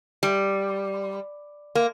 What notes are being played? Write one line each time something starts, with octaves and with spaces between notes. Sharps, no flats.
G3
A#3